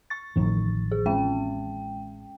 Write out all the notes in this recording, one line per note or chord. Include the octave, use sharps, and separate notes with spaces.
C#6 A6
A1 F2 D#3
G#4
G#3 C#4 G5